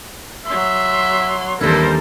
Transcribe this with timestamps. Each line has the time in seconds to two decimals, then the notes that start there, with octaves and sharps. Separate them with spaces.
0.46 F#3 E5 C6
1.61 D#2 E3 G3 D4 E4 A4 A#4 C5